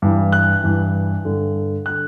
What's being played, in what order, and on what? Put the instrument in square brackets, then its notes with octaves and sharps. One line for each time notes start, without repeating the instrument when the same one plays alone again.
[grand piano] G2 E3
F#6
G2 E3
G2 D3
D3 F#6